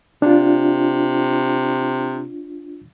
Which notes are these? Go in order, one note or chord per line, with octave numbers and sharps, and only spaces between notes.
C3 D4 F4